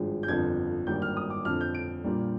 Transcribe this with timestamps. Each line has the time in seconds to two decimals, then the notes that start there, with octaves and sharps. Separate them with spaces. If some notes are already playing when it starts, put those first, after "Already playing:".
Already playing: G#1 G2 F3 G#3
0.23 G6
0.28 G1 F2 D3 F3 G#6
0.87 G#1 G2 D#3 G3 A#3 G6
1.02 F6
1.17 D#6
1.30 D6
1.45 F2 D3 F3 F6
1.61 G6
1.75 D7
2.04 A#1 A#2 G3 A#3